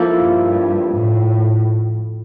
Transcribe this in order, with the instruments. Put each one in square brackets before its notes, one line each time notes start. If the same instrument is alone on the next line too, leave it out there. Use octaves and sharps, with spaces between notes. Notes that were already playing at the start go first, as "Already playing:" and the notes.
Already playing: [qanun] F3 A#3 E4 A4
[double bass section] G2
A2